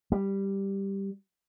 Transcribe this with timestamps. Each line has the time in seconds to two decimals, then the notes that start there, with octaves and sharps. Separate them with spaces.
0.12 G3